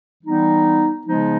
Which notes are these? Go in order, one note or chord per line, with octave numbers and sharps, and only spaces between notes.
E3 G3 B3 D#4
C#3 F3 G#3 B3 D#4